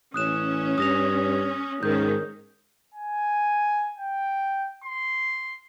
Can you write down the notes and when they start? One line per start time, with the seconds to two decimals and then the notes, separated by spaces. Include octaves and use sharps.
0.14 A1 C#4 D#6 F#6 E7
0.78 G2 D#6 A#6 F7
1.83 G#2 D#3 C#4 G6
2.94 G#5
3.98 G5
4.84 C6